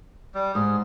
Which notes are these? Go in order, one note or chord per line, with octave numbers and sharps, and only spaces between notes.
G3
G#2 G#4